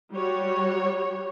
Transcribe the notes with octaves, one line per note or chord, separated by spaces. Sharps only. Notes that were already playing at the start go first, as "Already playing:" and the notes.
G3 F#4 C#5